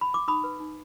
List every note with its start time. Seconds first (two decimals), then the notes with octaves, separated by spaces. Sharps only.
0.01 B5
0.14 D6
0.28 D#4 B5 D#6
0.44 B4
0.60 D#4